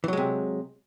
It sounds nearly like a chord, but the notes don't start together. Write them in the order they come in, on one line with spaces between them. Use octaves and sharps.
E3 F#3 G#3 C3